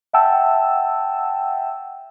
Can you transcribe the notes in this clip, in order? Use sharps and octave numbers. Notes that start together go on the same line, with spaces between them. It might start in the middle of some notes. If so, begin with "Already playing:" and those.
E5 F#5 G5 A5 E6